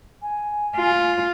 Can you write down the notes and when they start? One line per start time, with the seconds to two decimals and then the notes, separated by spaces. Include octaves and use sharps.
0.22 G#5
0.76 F4